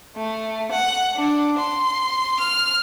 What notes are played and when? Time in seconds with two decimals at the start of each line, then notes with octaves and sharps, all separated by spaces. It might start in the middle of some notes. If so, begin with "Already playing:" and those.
0.17 A3
0.71 F#5
1.16 D4
1.58 C6
2.40 F6